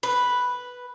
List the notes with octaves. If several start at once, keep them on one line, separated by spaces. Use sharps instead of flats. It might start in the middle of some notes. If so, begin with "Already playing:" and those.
B4